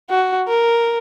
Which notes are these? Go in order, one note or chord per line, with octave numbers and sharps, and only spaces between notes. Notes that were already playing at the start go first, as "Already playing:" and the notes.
F#4
A#4